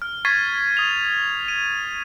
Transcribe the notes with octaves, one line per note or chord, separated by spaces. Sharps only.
F6
C#6 G#6 A6 B6 C7 D#7
D#6 F7
D#7